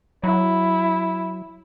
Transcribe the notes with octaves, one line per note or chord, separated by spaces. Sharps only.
F#3 E4